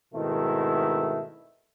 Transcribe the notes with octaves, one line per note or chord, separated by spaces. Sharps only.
G#2 B2 D#3 A3 C4 E4